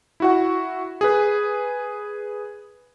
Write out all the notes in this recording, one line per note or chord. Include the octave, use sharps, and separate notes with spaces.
E4 F#4 F#5
G#4 B4